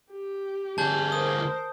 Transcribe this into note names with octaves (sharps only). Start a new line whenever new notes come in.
G4
D2 G#4 A5 G6
A#4 C5 D#6